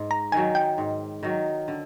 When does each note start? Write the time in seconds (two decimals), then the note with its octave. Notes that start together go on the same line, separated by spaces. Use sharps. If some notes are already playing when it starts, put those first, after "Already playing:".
Already playing: G#2
0.11 A#5
0.32 D#3 F#3 G#5
0.55 G5
0.78 G#2
1.23 D#3 F#3
1.68 D3